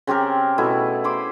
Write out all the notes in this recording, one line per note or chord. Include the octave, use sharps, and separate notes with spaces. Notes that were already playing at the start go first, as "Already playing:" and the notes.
C#3 C4 G4 A#4
B2 A3 E4 G#4
G#4 C5 B5 D6